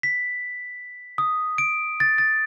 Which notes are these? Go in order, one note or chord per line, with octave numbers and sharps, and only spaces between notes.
B6
D#6
D7
A6
A6